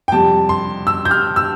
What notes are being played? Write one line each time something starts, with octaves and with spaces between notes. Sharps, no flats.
G5
F2 C3 G3 A5
C6
E6
G6
F6
E6